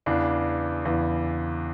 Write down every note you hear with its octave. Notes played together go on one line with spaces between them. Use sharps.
E2 C#3 E3 D4
E2 C#3 E3